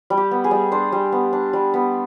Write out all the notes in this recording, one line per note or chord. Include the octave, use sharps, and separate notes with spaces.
G3
G4
B3
G#4
G3
D4 C5
G3
B3
D4
G3
B3